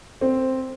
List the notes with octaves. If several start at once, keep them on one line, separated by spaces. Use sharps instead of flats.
C4